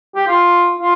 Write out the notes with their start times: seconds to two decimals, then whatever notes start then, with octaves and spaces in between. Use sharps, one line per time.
0.15 G4
0.27 F4
0.79 F4